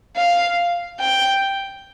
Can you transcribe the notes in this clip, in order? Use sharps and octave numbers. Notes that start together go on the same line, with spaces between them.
F5
G5